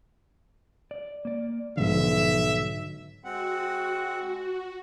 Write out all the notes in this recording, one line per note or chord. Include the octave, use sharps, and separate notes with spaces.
D5
A#3 D5
B1 G#2 D3 F3 E5
G#3 C4 F#4 F#5